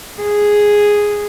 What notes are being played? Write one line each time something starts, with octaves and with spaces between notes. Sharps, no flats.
G#4